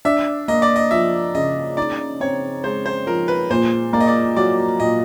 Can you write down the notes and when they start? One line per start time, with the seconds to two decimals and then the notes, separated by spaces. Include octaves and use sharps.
0.05 D4 E5
0.48 A#3 D#5
0.62 D5
0.76 D#5
0.91 F3 E5
1.35 C#3 D#5
1.77 D#4 D5
2.20 C4 C#5
2.64 G#3 C5
2.86 C5
3.07 F3 A#4
3.28 B4
3.50 A#2 C5
3.93 A#3 D5
4.00 D#5
4.07 D5
4.36 F#3 D5
4.80 A#2 D#5